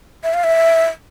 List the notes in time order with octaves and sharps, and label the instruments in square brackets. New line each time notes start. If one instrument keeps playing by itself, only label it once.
[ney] E5
F5
E5